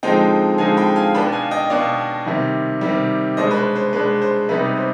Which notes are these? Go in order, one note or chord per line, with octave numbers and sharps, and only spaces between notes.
D3 F3 G#3 C4 D#4 D#5 G5
D3 F3 G#3 C4 D#4 F5 G#5
G5 B5
F5 G#5
B2 B3 D4 G5 B5
F5 G#5
D#5 G5
B2 B3 D4 D5 F5
C3 D#3 G3
C3 D#3 G3
B2 G#3 D4 C5 D#5
B4
C5
C5
B2 G#3 D4 B4
C5
C3 G3 B3 D#4 B4
C5